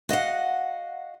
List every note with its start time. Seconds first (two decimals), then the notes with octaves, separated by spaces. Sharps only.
0.09 F#4 D#5 F5 F#5